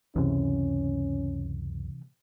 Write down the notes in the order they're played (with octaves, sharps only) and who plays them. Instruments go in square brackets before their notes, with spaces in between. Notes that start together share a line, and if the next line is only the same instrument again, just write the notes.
[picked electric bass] C#2 F#2 [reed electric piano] C3 E3 [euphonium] C#4